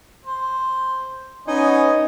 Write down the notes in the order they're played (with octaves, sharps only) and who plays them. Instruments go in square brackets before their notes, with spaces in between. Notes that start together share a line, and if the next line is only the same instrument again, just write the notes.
[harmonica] C5
[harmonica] B3 D#5 G#5 [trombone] C#4 [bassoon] D#4